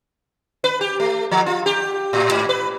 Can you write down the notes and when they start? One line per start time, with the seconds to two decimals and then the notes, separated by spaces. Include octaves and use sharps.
0.64 B4
0.81 G4
1.00 A3
1.31 F3
1.46 F4
1.66 G4
2.13 A2
2.31 G#2
2.49 B4